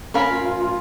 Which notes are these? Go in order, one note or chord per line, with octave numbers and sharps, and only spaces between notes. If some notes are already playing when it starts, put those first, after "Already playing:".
C#4 A#4 F5 B5
F4
F4
F4